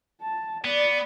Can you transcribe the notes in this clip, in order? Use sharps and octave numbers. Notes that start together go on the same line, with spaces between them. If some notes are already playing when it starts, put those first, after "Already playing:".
A5
B3 D5